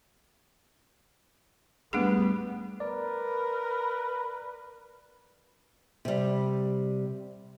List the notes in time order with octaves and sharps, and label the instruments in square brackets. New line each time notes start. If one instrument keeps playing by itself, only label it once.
[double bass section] G3 B3 [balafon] A3 D4 G#4
[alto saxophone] A#4 [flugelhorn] B4 [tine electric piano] D5
[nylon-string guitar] C3 G3